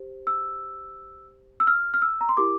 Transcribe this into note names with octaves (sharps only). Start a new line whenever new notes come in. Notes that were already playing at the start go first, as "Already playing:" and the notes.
Already playing: G4 C5
E6
E6
F6
F6
E6
A#5
C6
E4 G4 A#4 D6